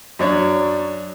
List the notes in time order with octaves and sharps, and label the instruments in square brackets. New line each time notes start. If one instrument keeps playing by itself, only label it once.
[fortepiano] F#2 D4 C#5